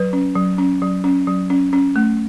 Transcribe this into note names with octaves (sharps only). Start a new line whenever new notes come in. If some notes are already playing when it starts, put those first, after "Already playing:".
Already playing: F#3 B4
C#4
F#3
C#4
F#3
C#4
F#3
C#4
C#4
A3